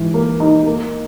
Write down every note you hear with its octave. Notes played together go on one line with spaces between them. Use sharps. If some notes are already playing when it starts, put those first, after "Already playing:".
Already playing: G#2 E3
A#3
D#4
A#3